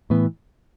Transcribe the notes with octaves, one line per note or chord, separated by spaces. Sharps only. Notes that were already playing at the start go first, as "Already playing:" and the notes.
A2 E3 B3